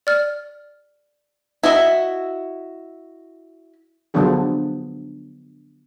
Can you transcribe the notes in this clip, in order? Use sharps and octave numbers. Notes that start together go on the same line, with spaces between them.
D5 F6
E4 F#4 D#5 E5
D3 F3 F#3 B3 D4 G#4